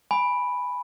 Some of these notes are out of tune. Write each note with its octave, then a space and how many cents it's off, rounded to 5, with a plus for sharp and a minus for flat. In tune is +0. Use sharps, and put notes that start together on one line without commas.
G#5 +0 B5 +0